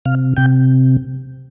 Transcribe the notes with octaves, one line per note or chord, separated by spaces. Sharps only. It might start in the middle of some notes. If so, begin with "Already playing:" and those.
C3 F5
C3 G5